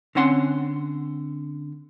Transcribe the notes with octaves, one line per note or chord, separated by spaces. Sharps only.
D3 C4 C#4 F#5 C6